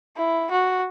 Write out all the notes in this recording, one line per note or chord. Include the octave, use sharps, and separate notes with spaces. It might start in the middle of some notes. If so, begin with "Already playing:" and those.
E4
F#4